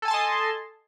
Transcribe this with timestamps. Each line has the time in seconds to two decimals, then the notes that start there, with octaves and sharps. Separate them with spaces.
0.02 A4
0.05 G#5
0.08 A5
0.11 C6
0.14 D#5